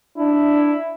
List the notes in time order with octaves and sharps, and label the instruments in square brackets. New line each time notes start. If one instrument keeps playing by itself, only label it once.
[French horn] D4 [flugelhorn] E4